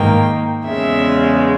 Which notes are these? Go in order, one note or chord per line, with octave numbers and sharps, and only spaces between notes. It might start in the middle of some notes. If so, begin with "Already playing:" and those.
Already playing: G#2 D#3 A#3 G5
E2 C#3 G#3 E5